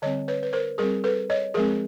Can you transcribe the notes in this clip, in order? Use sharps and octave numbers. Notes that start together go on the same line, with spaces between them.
D3 G3 C4 C#5 D#5
B4 C#5
B4
A#4 C5
G3 C4 G#4 A#4
A4 B4
C#5 D#5
F3 G#3 C4 G#4 A#4